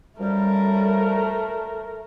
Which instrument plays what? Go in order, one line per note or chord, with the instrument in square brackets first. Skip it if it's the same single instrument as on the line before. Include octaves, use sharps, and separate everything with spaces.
[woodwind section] F#2 F3 G3 [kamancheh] A3 A#4